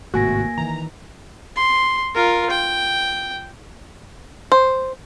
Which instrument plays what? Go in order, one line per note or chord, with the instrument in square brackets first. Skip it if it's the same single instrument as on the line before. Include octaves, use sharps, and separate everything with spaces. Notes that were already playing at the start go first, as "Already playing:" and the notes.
[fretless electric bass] G#1 A2 C3 [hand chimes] A#3 G#5 A#6 [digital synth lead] F#4
[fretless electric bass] D#3 E3 [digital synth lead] A#5
[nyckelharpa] C6
F4 A#4
G5
[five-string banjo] C5